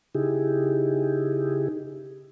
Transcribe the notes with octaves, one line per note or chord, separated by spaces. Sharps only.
C#3 D#4 E4 G4 G#4